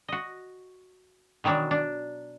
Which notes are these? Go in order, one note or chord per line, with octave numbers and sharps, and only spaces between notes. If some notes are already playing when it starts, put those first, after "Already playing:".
F#4 D#5
B2 D#3 E3 F#3 D4
D4